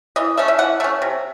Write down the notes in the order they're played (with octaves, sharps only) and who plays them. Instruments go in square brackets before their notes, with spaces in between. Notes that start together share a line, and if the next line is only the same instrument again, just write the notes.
[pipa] E3 D#5
A3 C#4 E5
E5
E3 F#5
A3 C#4 E5
C3